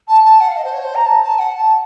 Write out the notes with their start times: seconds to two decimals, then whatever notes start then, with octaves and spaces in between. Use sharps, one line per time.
0.08 A5
0.23 A5
0.40 F#5
0.48 F5
0.56 D#5
0.64 C5
0.73 C#5
0.83 C5
0.94 A#5
1.05 A5
1.22 A5
1.38 F#5
1.54 A5